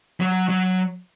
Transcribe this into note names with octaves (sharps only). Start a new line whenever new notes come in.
F#3
F#3